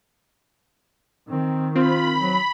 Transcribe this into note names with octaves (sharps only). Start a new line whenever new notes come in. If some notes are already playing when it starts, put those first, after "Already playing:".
D#3 C4
C4 F4 B5
F#3